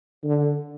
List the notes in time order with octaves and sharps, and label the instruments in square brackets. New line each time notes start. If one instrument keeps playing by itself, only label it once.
[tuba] D3